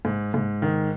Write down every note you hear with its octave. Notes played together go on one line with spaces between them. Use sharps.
G#2
G#2
D#3